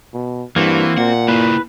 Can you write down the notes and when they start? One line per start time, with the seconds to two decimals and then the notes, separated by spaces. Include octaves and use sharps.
0.13 B2
0.56 G2 E3 A#3 C4 F#4
0.98 A#2 F#5
1.28 A#3 E4 B4